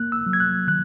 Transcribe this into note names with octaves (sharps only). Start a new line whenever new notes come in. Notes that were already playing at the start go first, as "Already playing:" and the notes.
Already playing: A#3 F#6
E6
F#3
G#6
F#6
D#3 F#6